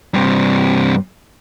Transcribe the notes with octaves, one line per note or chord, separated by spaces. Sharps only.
G2 C3